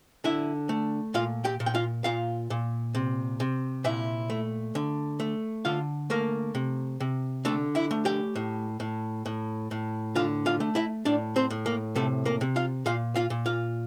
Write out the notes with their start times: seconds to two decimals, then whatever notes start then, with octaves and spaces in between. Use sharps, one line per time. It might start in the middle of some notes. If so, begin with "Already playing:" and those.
0.24 D3 E4 E5
0.69 A3
1.14 A#2 F4 F5
1.45 G4 G5
1.60 A#2
1.66 G5
1.75 F4 F5
2.04 A#2 F4 F5
2.50 A#2
2.95 C3
3.40 C3
3.84 A#2 E4 E5
4.30 A3
4.75 D3
5.20 A3
5.65 D3 F4 F5
6.10 A3 A#3 A#4
6.55 C3
7.00 C3
7.45 D3 A3 A4
7.75 E4 E5
7.91 A3
8.05 G4 G5
8.35 A2
8.80 A2
9.26 A2
9.71 A2
10.15 D3 F4 F5
10.46 F4 F5
10.60 A3
10.75 E4 E5
11.05 A2 D4 D5
11.36 C4 C5
11.50 A2
11.66 A#3 A#4
11.96 C3 A3 A4
12.25 A#3 A#4
12.41 C3
12.56 F4 F5
12.86 A#2 F4 F5
13.16 F4 F5
13.30 A#2
13.46 F4 F5